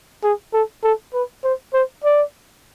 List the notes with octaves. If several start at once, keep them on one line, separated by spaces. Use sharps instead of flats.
G#4
A4
A4
B4
C5
C5
D5